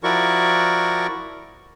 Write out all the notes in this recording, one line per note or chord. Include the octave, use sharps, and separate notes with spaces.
F3 E4 F#4 A#4 D5 C#6